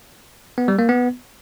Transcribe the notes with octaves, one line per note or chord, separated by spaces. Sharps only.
B3
G3
A#3
B3